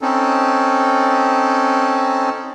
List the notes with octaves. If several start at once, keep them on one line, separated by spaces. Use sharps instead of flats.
C4 C#4 D#4 A4